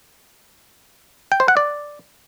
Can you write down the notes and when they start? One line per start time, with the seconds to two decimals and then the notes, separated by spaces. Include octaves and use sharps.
1.32 G5
1.40 C5
1.48 F#5
1.57 D5